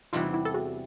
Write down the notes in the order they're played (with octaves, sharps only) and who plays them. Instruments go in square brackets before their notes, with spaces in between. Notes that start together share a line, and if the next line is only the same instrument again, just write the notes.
[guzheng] E2 C3 E3 G3 [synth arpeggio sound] D#4 F4
[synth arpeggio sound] E4 F#4
A4
F#4 G#4